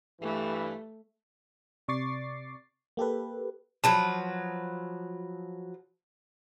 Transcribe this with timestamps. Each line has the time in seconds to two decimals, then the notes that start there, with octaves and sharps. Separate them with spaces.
0.22 G2 E3 A3
1.88 C3 D5 C#6 D6 A6 C7
2.97 A#3 G4 A4 B4
3.84 F3 F#3 B4 A5